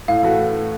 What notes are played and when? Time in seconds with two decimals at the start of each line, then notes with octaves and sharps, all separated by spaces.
0.08 A2 F5
0.23 E3 A3 F#4